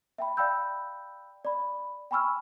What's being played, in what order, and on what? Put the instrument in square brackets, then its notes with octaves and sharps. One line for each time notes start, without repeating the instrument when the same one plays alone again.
[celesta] E5 G5 B5
D5 F5 G5 B5 E6 G6
D5 B5
G5 G#5 B5 C#6 E6 F6